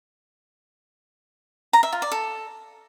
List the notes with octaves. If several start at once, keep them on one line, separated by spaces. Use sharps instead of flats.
A#5
E5
F4
D5
A4